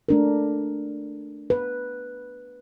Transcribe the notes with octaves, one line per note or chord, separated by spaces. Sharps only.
A3 D4 A#4
B4